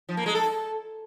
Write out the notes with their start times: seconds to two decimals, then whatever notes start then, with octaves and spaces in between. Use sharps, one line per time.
0.09 F3
0.17 A#3
0.26 G#3
0.35 A4